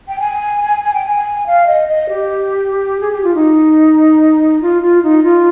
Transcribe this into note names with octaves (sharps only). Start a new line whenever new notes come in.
G5
G#5
G#5
G5
G#5
F5
D#5
D#5
G4
G#4
G4
F4
D#4
F4
F4
D#4
F4